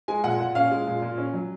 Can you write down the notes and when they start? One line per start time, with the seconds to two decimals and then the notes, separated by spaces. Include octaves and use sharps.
0.08 G#3 G#5
0.24 A#2 F#5
0.40 A#2
0.55 C#4 F5
0.71 G#3
0.87 A#2
1.02 A#2
1.18 C#4
1.33 F#3